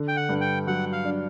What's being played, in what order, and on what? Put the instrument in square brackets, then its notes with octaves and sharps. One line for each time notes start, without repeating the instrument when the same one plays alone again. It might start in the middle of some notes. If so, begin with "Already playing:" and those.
Already playing: [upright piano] D3
[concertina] G5
F#5
[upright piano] G2
[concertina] G5
[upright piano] F#3 [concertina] F#5
[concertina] F5
[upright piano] D4